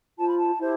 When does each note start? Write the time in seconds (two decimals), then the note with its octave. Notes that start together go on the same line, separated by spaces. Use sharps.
0.17 F4 C5 A5
0.27 B5
0.39 A5
0.59 E4 G4 C5